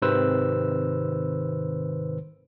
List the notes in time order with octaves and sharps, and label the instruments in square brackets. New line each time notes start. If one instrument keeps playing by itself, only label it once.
[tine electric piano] G#1 C3 D#3 B4 C5 E6